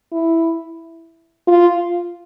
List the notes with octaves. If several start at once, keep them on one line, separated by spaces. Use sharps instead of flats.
E4
F4